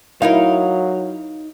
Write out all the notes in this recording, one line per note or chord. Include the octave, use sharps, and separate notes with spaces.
F#3 D#4 E4 A#4 F5